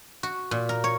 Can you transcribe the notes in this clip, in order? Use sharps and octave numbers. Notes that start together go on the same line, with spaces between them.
F#4
A#2
A#4
C#5